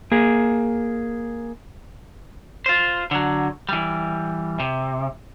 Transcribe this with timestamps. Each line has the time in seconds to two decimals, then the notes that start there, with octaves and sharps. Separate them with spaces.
0.12 A#3 G#4
2.66 F4 C5
3.11 D3 F#3
3.69 E3 G3
4.60 C3